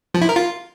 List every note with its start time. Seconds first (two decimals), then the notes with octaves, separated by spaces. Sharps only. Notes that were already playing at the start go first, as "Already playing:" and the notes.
0.14 F3
0.22 E4
0.29 A#4
0.36 F4